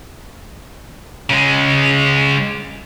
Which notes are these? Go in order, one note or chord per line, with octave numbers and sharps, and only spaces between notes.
C#3 G#3